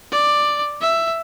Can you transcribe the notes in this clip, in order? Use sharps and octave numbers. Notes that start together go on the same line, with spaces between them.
D5
E5